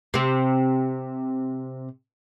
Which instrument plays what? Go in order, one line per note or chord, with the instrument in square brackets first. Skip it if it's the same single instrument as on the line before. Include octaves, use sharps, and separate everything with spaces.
[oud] C3 C4